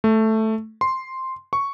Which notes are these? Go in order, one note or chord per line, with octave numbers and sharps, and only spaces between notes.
A3
C6
C#6